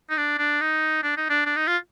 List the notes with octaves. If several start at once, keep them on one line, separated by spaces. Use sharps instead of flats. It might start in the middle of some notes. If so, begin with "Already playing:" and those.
D#4
D4
D4
D#4
D4
D#4
D4
D4
D#4
F4